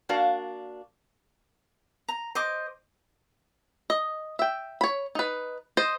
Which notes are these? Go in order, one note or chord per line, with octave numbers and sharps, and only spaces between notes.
A#3 D4 F#4 A#4 D5 F5
A#5
C5 D#5 D6
D#5
E5 G5
C#5 B5
D#4 B4
C5 D#5